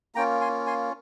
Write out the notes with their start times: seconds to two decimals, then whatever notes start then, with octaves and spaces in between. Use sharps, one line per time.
0.15 A#3 C#4 F4 G5 A#5
0.41 G#5 C6
0.66 G#5 C6